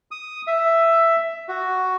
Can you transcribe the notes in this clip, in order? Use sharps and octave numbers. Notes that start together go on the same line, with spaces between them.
D#6
E5
F#4